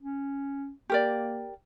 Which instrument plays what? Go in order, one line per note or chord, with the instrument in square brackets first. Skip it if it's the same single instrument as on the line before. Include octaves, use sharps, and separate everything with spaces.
[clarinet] C#4
[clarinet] A#3 [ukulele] G4 A#4 D5